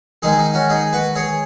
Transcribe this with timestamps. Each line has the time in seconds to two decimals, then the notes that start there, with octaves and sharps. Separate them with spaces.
0.22 G#2 D#3 G#3 D#4 G#4
0.39 D#4
0.54 C#4 F#4
0.69 D#4 G#4
0.93 F#4 B4
1.16 G#4 C#5